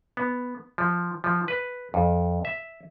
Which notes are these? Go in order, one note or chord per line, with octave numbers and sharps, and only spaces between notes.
B3
F3
F3
B4
F2
E5